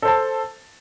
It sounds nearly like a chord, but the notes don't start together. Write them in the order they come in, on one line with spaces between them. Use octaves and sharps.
A4 C5 A5